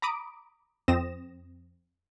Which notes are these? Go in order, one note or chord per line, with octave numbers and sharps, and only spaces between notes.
A#5 B5 D6 D#6 D7
F2 C4 D#6 A#6 E7